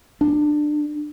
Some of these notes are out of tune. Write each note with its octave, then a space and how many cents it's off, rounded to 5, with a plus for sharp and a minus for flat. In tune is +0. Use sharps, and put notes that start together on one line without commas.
D4 +20